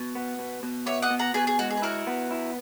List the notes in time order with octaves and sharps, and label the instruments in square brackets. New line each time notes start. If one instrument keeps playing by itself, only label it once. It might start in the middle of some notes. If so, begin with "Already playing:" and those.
Already playing: [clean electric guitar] B2
B3
B2
B2
[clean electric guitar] B3 [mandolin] C#5 E5
[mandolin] D#5 F#5
[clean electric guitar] B2
[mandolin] F#5 A#5
[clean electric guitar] B2 [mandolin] G#4 B4
[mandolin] G#4
[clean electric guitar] G#3 [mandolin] F#4
[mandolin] G#4
B4
[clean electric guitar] E4 [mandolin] F#4 A#4
[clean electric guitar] B3
E4